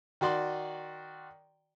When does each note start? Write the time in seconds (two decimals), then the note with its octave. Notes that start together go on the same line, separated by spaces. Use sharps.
0.21 D#3 F#4 D5 C6